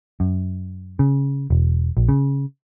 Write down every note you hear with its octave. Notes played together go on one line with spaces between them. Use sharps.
F#2
C#3
E1
A#1
C#3